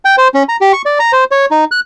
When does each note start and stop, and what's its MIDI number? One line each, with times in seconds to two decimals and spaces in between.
0.05 0.16 79
0.18 0.28 72
0.34 0.43 61
0.49 0.57 82
0.61 0.72 67
0.73 0.82 85
0.86 0.98 74
0.99 1.12 82
1.12 1.24 72
1.31 1.46 73
1.51 1.65 63
1.71 1.80 90